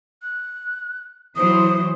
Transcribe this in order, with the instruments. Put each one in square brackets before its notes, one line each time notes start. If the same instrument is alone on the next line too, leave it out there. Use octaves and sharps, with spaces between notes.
[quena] F#6
[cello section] E3 F#3 C5 [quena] D#6